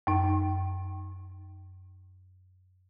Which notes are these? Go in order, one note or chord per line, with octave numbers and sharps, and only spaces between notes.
F#2 D#4